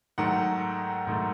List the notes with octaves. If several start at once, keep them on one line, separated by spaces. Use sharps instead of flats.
G#2 D#3 F#3 A3 F#5
G#2 D#3 F#3 A3